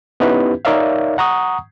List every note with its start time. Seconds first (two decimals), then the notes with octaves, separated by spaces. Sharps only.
0.20 B3 C#4 D#4 E4 G4 B4
0.65 D#4 A#4 C#5 D5 E5 F5
1.18 F#5 A#5 C#6 D#6